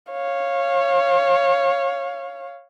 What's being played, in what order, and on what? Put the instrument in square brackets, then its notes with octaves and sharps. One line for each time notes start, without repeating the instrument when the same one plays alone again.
[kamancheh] C#5 F5